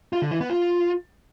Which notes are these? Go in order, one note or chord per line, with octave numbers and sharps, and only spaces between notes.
F4
D3
E3
B3
F4